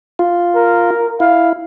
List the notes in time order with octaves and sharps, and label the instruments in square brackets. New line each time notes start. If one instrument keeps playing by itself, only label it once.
[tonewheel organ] F4
[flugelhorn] A#4
[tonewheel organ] E4 [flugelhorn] F5